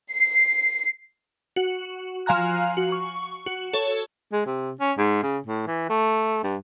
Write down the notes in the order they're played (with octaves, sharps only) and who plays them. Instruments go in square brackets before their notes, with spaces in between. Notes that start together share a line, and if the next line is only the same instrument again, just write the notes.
[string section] C7
[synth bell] F#4
F3 F5 G#5 A#5 F#6
F#4
C#6
F#4
A4 C#5
[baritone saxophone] G#3
C3
C#4
G#2
C#3
A2
E3
A3
G2